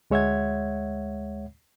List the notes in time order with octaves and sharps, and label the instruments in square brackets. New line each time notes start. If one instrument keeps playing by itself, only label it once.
[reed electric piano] D2 G#3 C#5 E5 F#5 G#6